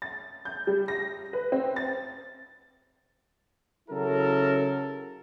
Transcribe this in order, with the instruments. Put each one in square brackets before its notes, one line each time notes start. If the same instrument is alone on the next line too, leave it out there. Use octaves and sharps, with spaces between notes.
[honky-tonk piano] A6
G6
G3
A#6
B4
C4
A6
[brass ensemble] C#3 F#3 E4 A4 A#4